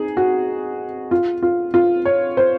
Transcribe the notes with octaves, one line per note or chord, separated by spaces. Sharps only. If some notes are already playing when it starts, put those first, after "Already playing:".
Already playing: D#4 G#4
F#4
F4
F4
F4
C#5
C5